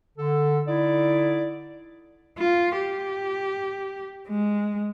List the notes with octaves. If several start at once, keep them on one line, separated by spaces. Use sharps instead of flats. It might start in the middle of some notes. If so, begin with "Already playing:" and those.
D3 A4
D3 D#4 E4 D5
F4
G4
G#3